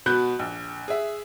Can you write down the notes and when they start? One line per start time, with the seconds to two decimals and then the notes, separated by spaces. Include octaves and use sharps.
0.06 B2 F#4 F#5 B5 F#6 G6
0.39 A#1
0.88 G#4 E5